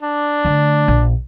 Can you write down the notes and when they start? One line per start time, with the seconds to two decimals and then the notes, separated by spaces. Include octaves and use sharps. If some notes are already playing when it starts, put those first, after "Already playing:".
0.02 D4
0.45 D3 A3
0.88 A#1